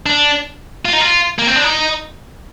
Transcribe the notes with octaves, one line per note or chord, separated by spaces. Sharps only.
D4
F4
D#4
F4
A#3
C4
D4
D#4